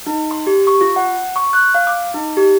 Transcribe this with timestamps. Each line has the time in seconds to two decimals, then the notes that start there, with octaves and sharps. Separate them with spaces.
0.07 D#4
0.31 C6
0.47 G4
0.67 C#6
0.81 F4
0.96 F#5
1.36 C#6
1.53 F#6
1.74 F5
1.87 D6
2.14 D#4
2.37 G4